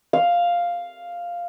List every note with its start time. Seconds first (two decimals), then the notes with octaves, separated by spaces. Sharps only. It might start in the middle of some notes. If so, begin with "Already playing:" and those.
0.13 F5